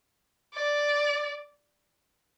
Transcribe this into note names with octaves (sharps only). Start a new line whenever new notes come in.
D5